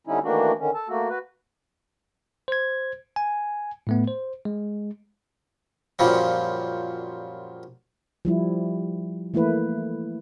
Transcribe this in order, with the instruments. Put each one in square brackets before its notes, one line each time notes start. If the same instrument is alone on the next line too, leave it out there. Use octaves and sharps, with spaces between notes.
[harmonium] D3 G3 C#4 D#4 E4
D#3 E3 A3 A#3 D4 F#4
D3 D#3 C#4
A4 A5
A3 A#3 F#4
F#4 B4
[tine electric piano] C5 G#6
G#5
A2 A3 B3
C5
G#3
[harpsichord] F#2 A#2 F3 G3
[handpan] F3 G3 E4
E3 A3 A#3 E4 B4